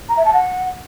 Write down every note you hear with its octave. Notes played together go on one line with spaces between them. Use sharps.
A#5
E5
A5
F#5